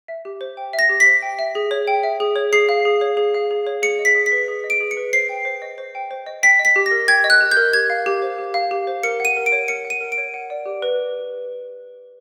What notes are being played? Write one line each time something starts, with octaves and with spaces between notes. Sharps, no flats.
E5
G4
C5
G5
E5
A#6
G4
B6
C5
G5
E5
G#4
C#5
G5
E5
G#4
C#5
G#4 C7
F5
G#4
C#5
G#4
F5
G#4
C#5
G#4 C#7
D#5
B6
G#4
B6
B4
G#4
D#5
D7
G#4
C#7
B4
C5 C7
G5
C5
D#5
C5
G5
C5
D#5
G5 B6
D#5
B6
G4
A#6
A#4
G5 G#6
D#5
F#6
G4
G6
A#4
G4 G#6
F5
G4
C5
G4
F5
G4
C5
A#4 C#7
F#5 D#7
A#4
D7
C#5
A#4 C#7
F#5
D#7
A#4
D7
C#5
F#5
D5
G4
B4